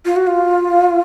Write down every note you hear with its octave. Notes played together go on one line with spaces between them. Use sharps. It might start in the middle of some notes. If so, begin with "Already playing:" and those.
F4
F#4
F4